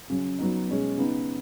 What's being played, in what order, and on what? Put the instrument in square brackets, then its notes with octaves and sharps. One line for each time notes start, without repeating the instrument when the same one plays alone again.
[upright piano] C#3 F#3 C#4
F#3 B3 D#4
B2 G#3 C#4
C#3 B3 D#4